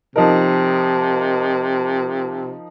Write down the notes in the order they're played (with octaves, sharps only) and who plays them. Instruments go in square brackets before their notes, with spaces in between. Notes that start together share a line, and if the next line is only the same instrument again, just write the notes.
[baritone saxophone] C3 [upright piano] F3 D#4 A#4